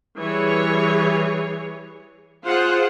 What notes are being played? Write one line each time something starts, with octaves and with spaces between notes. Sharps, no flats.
E3 G3 G#4 C#5
F4 G#4 C5 F#5